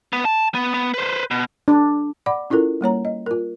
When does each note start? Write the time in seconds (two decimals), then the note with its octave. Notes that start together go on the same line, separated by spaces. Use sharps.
0.13 B3
0.25 A5
0.55 B3
0.74 B3
0.94 B4 C5
1.31 B2
1.68 D4
2.26 D5 F#5 B5 D6
2.50 C#4 E4 F4 A4 A#4
2.81 G3 A#3 C#5 A#5
3.05 D#5
3.26 F4 A#4